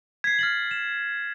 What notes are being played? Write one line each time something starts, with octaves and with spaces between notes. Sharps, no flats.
G#6 B6 C7
F6 A6 F#7
E7